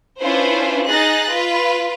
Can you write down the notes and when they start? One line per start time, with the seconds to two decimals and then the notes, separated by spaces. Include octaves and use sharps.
0.19 C#4 D4 E4 F4 B4 C5
0.86 D#4 G#4 D#5 F#6 A6 A#6
1.30 F4 B4